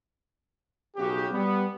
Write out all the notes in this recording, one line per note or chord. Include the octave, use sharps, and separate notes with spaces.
B1 C#3 F#4 G4
G3 B3